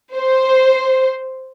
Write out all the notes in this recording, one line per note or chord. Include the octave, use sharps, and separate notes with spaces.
C5